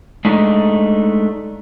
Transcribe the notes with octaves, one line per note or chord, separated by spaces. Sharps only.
G#3 A3 D4 D#4